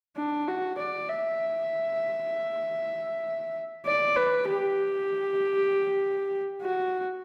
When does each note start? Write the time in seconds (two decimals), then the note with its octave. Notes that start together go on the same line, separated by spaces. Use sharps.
0.17 D4
0.48 F#4
0.78 D5
1.09 E5
3.86 D5
4.16 B4
4.48 G4
6.62 F#4